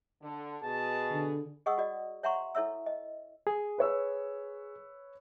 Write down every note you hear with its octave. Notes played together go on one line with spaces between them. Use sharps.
D3
B2 G#4 A5
D3
G#4 D#5 F#5 C#6 D#6 E6
F#4 D5 D#5
C#5 E5 F#5 A#5 C6 C#6
E4 A4 C#5 E5 E6
D#5
G#4
B4 C#5 E6